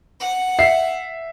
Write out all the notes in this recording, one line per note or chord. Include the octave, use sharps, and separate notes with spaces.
F#5
E5 C7